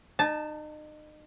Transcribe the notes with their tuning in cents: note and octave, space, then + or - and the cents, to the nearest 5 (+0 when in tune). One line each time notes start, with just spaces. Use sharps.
D#4 -35 A5 +0